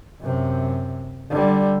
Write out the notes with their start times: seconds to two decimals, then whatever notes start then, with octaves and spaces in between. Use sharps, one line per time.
0.21 F#2 C3
1.30 D3 G3